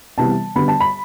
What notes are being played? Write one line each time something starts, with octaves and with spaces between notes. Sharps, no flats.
C3 E3 G3 B3 A5
D3 G3 B3 B5
A5
B5